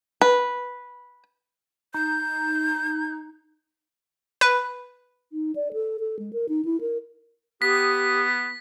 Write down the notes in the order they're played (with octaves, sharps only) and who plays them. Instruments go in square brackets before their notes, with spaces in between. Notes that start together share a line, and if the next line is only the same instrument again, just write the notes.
[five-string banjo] B4
[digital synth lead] D#4 [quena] G6
[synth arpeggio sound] B4
[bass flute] D#4
D5
A4
A4
G#3
A#4
D#4
E4
A#4
[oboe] B3 [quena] G4 [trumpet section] D#6 [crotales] B6